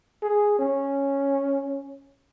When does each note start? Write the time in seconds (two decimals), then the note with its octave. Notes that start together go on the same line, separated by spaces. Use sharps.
0.22 G#4
0.59 C#4